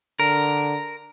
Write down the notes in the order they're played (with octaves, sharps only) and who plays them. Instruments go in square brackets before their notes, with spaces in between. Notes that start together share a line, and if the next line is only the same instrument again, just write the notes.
[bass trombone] D3 [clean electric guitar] A#4